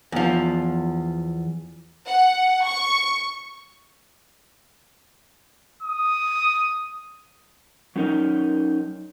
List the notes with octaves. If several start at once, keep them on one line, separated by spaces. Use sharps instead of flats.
E2 F3
F#5
C#6
D#6
F#3 C#4 D#4 A#4 D#5